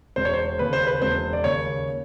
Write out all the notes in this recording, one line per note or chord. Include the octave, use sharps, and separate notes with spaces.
E1 C5
C#5
C5
D#2 C#3 B4
C5
B4
E1 C5
D5
D#2 C#3 C#5